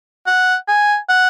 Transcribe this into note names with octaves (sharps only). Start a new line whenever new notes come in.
F#5
G#5
F#5